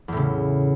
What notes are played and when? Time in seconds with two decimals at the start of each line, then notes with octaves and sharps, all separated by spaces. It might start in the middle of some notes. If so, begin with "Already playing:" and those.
0.08 E2
0.12 A2
0.17 C#3